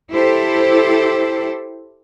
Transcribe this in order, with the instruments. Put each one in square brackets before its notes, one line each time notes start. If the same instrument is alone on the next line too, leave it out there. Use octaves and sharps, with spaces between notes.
[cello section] E4 G4 A4 C5